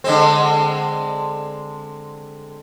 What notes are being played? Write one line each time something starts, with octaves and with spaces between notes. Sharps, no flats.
D3 G#3 C4